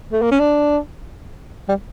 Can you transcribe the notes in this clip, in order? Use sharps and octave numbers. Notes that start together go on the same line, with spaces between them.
A3
A#3
C#4
D4
G3